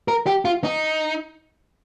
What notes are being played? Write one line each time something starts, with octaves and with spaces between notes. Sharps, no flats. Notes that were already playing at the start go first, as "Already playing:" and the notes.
A#4
G4
F4
D#4